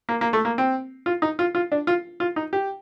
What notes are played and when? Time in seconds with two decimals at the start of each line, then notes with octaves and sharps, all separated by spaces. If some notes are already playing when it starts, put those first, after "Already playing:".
0.09 A#3
0.21 A#3
0.33 A3
0.45 A#3
0.58 C4
1.06 F4
1.22 D#4
1.39 F4
1.55 F4
1.72 D4
1.87 F4
2.20 F4
2.36 D#4
2.53 G4